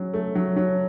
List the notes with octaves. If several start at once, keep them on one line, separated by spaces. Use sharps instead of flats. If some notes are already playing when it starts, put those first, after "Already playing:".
Already playing: F#3 C#4
A3
F#3
F#3